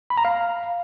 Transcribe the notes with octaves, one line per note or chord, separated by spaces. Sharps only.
B5
A#5
F5